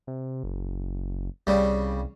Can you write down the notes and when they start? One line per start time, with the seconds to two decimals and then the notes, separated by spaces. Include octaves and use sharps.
0.07 C3
0.44 F#1
1.47 C2 C#3 G3